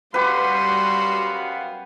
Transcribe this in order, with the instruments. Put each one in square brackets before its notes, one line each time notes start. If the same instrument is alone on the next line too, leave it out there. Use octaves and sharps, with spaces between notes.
[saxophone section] F#2 B3 F5 [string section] G3 F#4 [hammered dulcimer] G4 B4 [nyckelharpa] C6